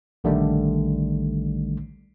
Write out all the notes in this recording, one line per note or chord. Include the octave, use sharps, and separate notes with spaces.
A#1 D3 D#3 G3 A3